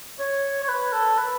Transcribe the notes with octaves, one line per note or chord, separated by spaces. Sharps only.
C#5
C#5
B4
A4
B4